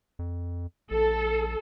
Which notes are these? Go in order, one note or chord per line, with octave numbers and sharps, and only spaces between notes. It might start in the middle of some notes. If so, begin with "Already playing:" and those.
F2
A#1 A4